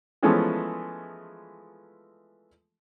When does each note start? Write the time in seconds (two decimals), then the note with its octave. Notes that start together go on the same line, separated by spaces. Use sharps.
0.23 E3 F3 G#3 A3 B3 C#4